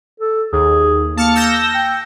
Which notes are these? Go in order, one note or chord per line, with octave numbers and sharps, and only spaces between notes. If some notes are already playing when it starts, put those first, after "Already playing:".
A4
D#2 G#4
A#3 A5 F6 C#7
E6 G6 A#6
G5